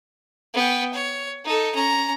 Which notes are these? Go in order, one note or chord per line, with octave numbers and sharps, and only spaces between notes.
B3 G5
C#5
D#4 A4
C#4 A#5